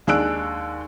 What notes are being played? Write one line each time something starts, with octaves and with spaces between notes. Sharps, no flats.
D#2 G#3 D4 E6 F#6 D7